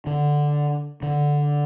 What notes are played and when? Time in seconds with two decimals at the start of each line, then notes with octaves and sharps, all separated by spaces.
0.07 D3
1.03 D3